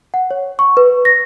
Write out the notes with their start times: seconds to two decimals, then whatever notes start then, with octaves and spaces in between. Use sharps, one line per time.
0.14 F#5
0.31 C#5
0.59 C#6
0.77 B4
1.05 A#6